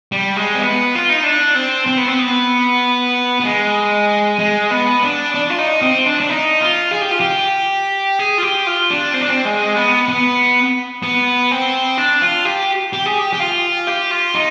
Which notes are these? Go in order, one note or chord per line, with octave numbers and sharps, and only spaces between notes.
G3
G#3
C4
B3
F4
D#4
D4
C4
C4
B3
C4
B3
B3
G#3
G#3
B3
D4
D4
F4
D#4
C4
D4
D4
D#4
F4
G#4
G4
F4
G4
G#4
F4
G4
F4
D4
C4
D4
C4
G#3
B3
B3
B3
C4
D4
F4
G4
G4
G#4
G4
G4
F4
G4
F4
D#4